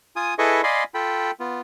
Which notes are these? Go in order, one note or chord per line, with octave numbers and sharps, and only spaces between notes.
F4 G#5 D#6
E4 G#4 A4 B4 D#5 C#6
D5 D#5 F5 G#5 B5 C6
F4 A4 G5 B5
B3 F4